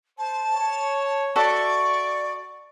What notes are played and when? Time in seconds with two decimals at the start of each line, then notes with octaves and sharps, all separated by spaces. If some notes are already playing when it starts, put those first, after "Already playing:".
0.18 C5 A5
0.53 C#5
1.36 F#4 A4 D5 E5 C#6